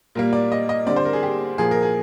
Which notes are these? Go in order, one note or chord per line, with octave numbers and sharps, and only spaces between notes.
A#2 G3 A#3 A#4
D5
D#5
D#5
D3 G3 C4 D5
C5
A#4
G#4
G4
A#2 F3 A#3 G#4
A#4
G#4